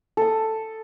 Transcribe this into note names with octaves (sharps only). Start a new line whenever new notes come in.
A4 D#6